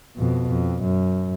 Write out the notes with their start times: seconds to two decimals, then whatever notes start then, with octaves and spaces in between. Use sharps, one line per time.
0.17 F2 B2
0.49 F2
0.82 F#2